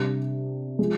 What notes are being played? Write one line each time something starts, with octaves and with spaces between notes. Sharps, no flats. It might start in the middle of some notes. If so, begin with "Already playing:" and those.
Already playing: C3 G3 D4
F3 G#3